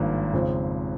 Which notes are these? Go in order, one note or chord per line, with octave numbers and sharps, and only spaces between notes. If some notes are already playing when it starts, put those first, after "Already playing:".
Already playing: G#1 G2 F3 A#3
F2 C#3 F3 G#3 C4